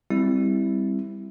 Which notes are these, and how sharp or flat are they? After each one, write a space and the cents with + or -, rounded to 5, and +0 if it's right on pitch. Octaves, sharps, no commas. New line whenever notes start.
G3 +20 C4 +0 E4 +0